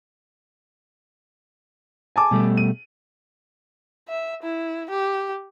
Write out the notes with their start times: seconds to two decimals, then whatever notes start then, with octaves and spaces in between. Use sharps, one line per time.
2.16 G#5 A5 D6
2.31 B2 G3 A3
2.57 D#7
4.09 E5
4.43 E4
4.90 G4